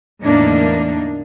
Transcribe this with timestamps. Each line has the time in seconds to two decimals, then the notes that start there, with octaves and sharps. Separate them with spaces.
0.23 E2 A2 D3 A#3 D4 D#4